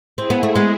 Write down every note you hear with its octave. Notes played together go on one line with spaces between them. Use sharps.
C4 E4 G#4
B3
A3
G#3 B3